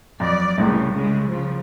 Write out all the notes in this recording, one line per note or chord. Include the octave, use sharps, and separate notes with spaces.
F2 F#3 D5
C2 A2 C#3 E3
C#3 G#3
C#3 F3